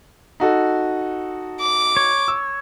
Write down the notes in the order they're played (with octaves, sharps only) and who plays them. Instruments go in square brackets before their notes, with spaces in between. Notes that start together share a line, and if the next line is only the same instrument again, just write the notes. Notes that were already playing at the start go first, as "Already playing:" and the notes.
[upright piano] D#4 F#4 A4
[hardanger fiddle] D6
[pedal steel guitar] C#5
[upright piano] E6